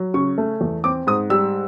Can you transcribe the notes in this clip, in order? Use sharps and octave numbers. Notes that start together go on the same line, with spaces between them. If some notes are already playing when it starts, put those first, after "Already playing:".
Already playing: F#3
C#3 C#6
A3
E2
C4 D6
G#2 D#6
G3 E6